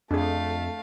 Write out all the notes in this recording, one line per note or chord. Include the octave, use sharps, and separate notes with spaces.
F2 A3 D4 G#4 F5